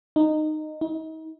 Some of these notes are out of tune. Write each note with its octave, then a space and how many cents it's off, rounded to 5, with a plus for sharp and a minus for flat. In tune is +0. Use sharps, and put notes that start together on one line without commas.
D#4 -15
D#4 +40